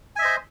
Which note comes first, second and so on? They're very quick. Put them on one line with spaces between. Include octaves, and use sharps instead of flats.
G#5 E5 D#5 C5